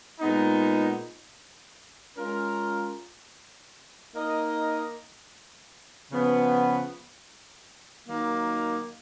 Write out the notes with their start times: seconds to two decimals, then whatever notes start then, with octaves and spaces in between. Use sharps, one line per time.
0.20 A#2 G#3 B3 D#4
2.16 G#3 C#4 F4 A#4
4.13 A#3 D#4 A#4 D#5
6.10 C#3 F3 B3
8.07 D#3 F#3 A#3 D#4